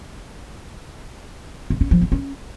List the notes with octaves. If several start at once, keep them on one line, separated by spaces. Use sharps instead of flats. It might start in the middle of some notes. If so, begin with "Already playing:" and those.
C#4
C#4
F3
C4
C#4